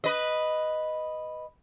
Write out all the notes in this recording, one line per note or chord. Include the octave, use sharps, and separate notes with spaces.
B4 D#5